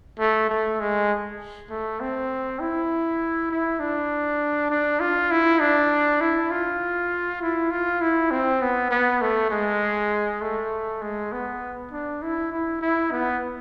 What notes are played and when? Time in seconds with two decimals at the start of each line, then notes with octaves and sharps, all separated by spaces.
0.19 A3
0.49 A3
0.80 G#3
1.70 A3
2.00 C4
2.60 E4
3.51 E4
3.80 D4
4.70 D4
5.00 F4
5.31 E4
5.61 D4
6.21 E4
6.51 F4
7.41 E4
7.71 F4
8.01 E4
8.31 C4
8.62 B3
8.91 B3
9.22 A3
9.51 G#3
10.41 A3
11.02 G#3
11.32 B3
11.91 D4
12.22 E4
12.52 E4
12.81 E4
13.12 B3